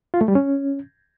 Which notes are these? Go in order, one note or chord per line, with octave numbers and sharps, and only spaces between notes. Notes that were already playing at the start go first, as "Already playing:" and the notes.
F4
A3
G3
C#4